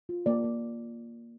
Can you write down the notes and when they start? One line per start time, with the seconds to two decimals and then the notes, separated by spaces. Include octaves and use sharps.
0.09 F4
0.26 A#3 D5
0.44 A#3